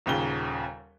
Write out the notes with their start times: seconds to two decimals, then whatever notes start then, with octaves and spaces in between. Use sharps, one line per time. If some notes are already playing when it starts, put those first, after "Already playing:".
0.06 D#1 D#2 C#3 G7